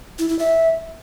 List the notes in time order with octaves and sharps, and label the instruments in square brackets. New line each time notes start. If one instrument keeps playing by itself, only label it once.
[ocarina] E4
E4
E5